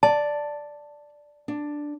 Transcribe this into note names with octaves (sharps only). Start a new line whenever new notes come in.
D5 A5
D4